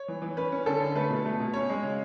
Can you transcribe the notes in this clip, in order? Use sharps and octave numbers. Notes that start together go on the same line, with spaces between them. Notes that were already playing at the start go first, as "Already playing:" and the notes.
Already playing: C#5
E3
E3
C#4 B4
C#4
D3 A4
D3
A3 B4
B2
A3
B2
C#4 C#5
G#3
C#3